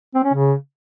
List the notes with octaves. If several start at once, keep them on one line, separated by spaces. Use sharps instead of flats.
C4
C#4
C#3